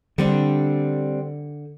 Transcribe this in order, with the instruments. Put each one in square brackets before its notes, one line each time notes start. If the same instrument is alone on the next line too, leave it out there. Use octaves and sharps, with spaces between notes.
[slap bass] D3 [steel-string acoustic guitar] G3 C4 D4